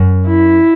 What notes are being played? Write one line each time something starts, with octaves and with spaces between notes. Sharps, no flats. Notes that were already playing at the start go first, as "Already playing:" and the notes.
Already playing: F#2
E4